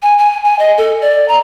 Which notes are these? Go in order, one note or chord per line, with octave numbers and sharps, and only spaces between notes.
G#5
G#5
G#5
D#5
A4
D5
A#5